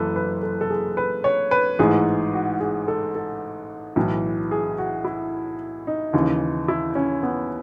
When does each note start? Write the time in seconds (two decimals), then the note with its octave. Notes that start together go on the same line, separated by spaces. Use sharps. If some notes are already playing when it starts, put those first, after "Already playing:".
Already playing: F#1 F#2 E3 A4 B4
0.16 B4
0.43 A4
0.61 A4
0.70 G#4
0.97 B4
1.24 C#5
1.51 B4
1.79 A1 G#2 E3 G#4
2.34 F#4
2.60 G#4
2.88 A4
3.15 A4
3.96 B1 A2 E3
4.51 G#4
4.78 F#4
5.05 E4
5.87 D#4
6.13 D#2 C#3 E3
6.68 E4
6.95 C#4
7.23 B3